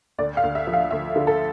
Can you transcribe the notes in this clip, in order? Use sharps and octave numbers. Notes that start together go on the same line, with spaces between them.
D2 D5
F5
D2
E5
F3
F5
D2 E5
D3
A4